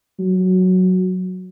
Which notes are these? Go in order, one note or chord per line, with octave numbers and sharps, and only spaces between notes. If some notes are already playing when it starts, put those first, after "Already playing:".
F#3